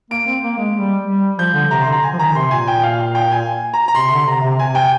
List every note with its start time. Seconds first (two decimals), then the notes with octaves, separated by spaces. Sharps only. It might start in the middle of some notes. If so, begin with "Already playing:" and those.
0.11 A#3 D7
0.26 C4
0.43 A#3
0.58 G#3
0.75 G3
1.07 G3
1.39 F3 G6
1.54 D3
1.71 C3 A#5
1.81 D3 C6
1.92 A#5
2.03 G#5
2.14 F3
2.19 D#3 A#5
2.35 C3 C6
2.51 A#2 G#5
2.67 G5
2.83 F5
2.99 F5
3.15 G5
3.32 G#5
3.74 A#5
3.88 A#5
3.95 C3 C6
4.11 D3
4.27 C3 A#5
4.43 C3
4.59 C3 G#5
4.75 G5